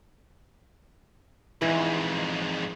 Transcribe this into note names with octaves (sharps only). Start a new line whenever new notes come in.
F2 G#2 E3